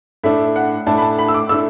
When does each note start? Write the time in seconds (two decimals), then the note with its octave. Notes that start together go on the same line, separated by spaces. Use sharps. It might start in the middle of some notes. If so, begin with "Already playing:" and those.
0.24 A2 A3 D4 E5
0.56 F#5
0.86 A2 A3 D4 A5
0.98 B5
1.02 A5
1.19 B5
1.28 E6
1.34 D6
1.49 A2 A3 D4 E6